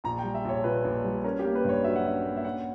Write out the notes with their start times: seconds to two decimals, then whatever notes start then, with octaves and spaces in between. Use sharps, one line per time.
0.04 A#1 A#5
0.19 G5
0.24 G3
0.34 E5
0.45 A#1 C#5
0.64 A#2 B4
0.84 A#1
1.04 G3
1.24 C#4 A#4
1.39 G4
1.45 A#3
1.55 B4
1.64 G2 C#5
1.84 F#3 E5
1.96 F#5
2.04 C#4 E5
2.24 A#3
2.37 E5
2.45 C#4 F#5